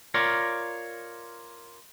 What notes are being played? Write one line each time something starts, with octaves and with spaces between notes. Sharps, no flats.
F4 A#4 C#5 D5